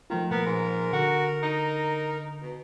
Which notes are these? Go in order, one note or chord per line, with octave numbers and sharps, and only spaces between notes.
D#3 F3 A3 F4
A#2 F3 B3 A#4
G#2
D3 F#4
D#4
B2